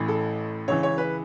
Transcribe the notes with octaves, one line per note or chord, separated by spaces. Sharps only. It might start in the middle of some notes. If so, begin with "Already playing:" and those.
Already playing: A1 A2 E3
A4
C#2 C#3 E3 C#5
C#5
B4